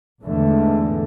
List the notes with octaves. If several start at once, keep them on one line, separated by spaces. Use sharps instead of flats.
E2 G#2 D3 G#3 A3